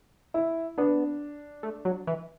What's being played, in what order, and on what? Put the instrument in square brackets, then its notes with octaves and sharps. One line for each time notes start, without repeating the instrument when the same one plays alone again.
[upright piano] E4
[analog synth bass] B3 [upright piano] D4
[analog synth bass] A3
F#3
E3